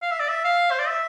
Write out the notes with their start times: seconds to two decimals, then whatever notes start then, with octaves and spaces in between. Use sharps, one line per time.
0.02 F5
0.11 E5
0.20 D5
0.29 E5
0.45 F5
0.71 C5
0.79 D5
0.88 E5